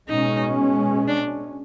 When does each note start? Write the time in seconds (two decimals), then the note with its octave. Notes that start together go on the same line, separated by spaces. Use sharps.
0.09 B2 G#3 C#4 D#4
1.08 D4